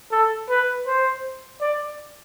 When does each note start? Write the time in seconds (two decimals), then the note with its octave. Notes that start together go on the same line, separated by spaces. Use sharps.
0.12 A4
0.50 B4
0.87 C5
1.61 D5